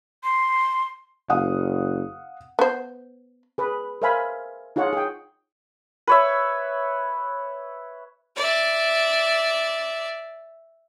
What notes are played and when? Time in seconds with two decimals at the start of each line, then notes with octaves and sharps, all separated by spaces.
0.23 C6
1.29 F#1 F5 F#5 D#6
2.59 B3 C5
3.58 G#4 B4
4.02 A#4 C5 E5 F5 G#5 B5
4.76 D#4 F4 G#4 C#5 F#5
4.93 G#4 G5
6.07 B4 C#5 E5
8.36 D5 E5